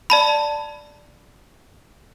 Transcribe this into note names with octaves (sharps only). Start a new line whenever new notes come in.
D5 A5 B5